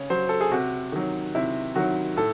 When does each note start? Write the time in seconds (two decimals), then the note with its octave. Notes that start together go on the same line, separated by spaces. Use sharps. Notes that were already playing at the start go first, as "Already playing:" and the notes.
Already playing: C#3 C#5
0.10 F#3 C5
0.29 A4
0.41 G#4
0.51 C3 F#4
0.92 D#3 F#3
1.35 C3 E4
1.75 D#3 F#3 F#4
2.17 A2 A4